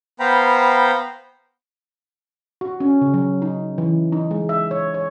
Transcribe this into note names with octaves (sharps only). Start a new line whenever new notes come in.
B3 C5 F5 G5 A#5 B5
F#4
C#4
C#3
F#3
D#4
E3
D#4
G#3
E5
C#5
C#5